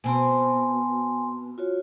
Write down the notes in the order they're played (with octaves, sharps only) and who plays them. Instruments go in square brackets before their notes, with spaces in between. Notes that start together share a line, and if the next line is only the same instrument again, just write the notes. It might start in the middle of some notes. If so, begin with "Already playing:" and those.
[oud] B2 C4 [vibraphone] G#5 A5 C6
[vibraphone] F4 F#4 C#5